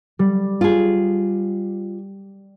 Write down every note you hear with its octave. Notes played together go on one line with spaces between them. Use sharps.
G3
F4 G#4